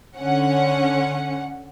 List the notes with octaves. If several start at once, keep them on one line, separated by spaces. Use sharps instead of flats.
D3 C#4 F#5